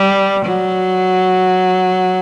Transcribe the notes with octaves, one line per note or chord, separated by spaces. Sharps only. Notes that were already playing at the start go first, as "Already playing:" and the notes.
Already playing: G3
F#3